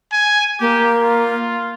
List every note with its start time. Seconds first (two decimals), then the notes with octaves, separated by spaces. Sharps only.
0.12 G#5
0.60 A#3 G4
1.03 F4